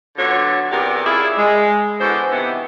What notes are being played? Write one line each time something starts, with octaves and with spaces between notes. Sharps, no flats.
D3 F#3 B3 F4 A4 C#5
E2 C3 B3 G4 A#4 D5
E4 F4 G#4 D5 E5
G#3
D3 E3 B3 F#4 C5
C3 D#3 E3 B3